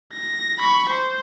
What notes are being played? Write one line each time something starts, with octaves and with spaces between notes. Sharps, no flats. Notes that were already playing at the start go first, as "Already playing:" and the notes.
A#6
B5 C#6
C5